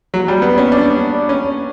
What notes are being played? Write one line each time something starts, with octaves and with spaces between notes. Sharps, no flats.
F#3
G3
B3
C#4
D4
C#4